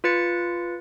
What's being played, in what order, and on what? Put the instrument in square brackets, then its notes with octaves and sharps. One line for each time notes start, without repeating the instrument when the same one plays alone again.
[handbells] F4 B4 A6 C#7